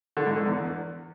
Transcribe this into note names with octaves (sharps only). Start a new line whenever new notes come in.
D3
G#2
D3
E2